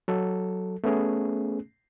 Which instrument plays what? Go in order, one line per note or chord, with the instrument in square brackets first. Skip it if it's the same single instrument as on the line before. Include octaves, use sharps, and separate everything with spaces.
[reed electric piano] F#3 A4
A3 B3 C#4 G#4